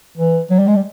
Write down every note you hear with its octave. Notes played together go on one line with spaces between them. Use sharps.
E3
F#3
G3
G#3
G3